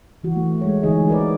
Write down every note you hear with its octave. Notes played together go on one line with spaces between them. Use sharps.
E3 F#4
A3
G#3 C#5
D3 E3 A3 D#4 G#4 D#5
F#4 A#4 B4 D5